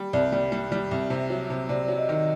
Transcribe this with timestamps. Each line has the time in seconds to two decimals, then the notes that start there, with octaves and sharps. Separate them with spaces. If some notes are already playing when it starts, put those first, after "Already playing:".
Already playing: G3
0.13 C2 D5
0.32 G3 D5
0.52 G3
0.72 G3
0.91 C2
1.10 C3
1.30 F#3
1.50 C3
1.69 C3 D5
1.84 D5
1.88 F#3
1.98 D#5
2.09 D#3 D#5